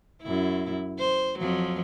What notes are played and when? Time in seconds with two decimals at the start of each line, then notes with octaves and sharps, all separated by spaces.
0.23 F#2 E4
0.99 C5
1.39 F2 F3 F#3